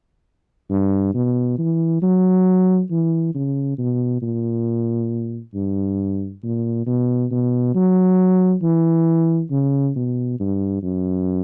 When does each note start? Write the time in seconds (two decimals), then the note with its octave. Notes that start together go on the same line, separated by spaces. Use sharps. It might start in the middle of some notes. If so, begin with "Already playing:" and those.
0.70 G2
1.14 B2
1.58 E3
2.02 F#3
2.91 E3
3.34 C#3
3.78 B2
4.22 A#2
5.54 G2
6.43 A#2
6.86 B2
7.31 B2
7.75 F#3
8.63 E3
9.50 C#3
9.96 B2
10.40 G2
10.83 F#2